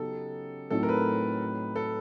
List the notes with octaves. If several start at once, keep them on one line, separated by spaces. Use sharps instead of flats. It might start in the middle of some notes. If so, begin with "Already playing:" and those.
Already playing: C#3 F#3 B3 D#4 G4 A4
A2 F#3 A3 C4 D#4 A4
A#4
B4
A4